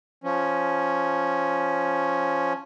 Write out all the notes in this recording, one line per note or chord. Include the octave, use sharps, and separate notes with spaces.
F3 C#4